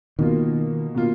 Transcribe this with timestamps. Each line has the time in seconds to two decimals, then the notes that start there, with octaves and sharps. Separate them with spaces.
0.19 B2 D#3 A#3 F4
0.95 B2 A#3 F4